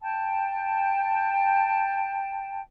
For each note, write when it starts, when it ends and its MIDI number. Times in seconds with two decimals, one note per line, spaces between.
0.02 2.59 79
0.02 2.59 81